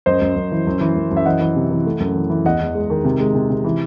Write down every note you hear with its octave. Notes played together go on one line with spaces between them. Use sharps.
F#2 C5 D#5
F#2
F#2
E3
F#2
E3
F#2
F#2
E5
E3 D#5 F#5
E3
C3
E3
A3
F#2
E3
E3
E2 D#5 F#5
E2
G#3
D#3
C3
G#3
C3
C3
E3